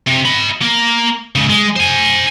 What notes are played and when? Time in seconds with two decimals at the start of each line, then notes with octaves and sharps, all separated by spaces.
0.07 C3
0.25 D#5 B5
0.62 A#3 A#4
1.35 G#2 C#3
1.50 G#3
1.76 C5 G#5